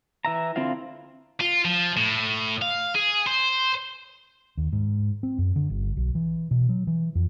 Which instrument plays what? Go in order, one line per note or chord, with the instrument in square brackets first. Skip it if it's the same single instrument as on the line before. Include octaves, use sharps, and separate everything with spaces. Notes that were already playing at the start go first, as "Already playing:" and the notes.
[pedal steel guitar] E3 E5 A#5
D3 C4 E4 F4 F5
[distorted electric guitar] F4
F3
A2
F5
G#4
C5
[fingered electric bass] D#2
G#2
C4
F#2
D3
G1
B1
E3
B2
F#3
E3
F2